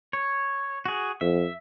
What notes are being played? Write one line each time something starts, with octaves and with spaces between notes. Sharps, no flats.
C#5
F#4 G#4
F2 E5